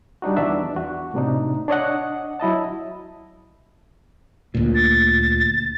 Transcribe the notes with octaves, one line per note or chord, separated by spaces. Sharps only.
G3 D4 D#4 F#4
E2 E3 D4 E5
F#4
A2 C3 D4 D#4
D4 C#5 D#5 F#5
F#3 E4 D#5 A5
D2 A#2
A6